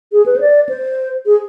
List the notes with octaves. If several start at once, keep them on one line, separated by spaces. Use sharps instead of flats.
G#4
B4
C5
D5
C5
G#4